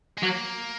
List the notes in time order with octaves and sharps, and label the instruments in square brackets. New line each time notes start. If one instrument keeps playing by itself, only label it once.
[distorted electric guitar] G#3
[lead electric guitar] F#3 [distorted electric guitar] A#3